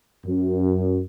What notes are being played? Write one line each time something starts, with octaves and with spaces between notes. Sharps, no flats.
F#2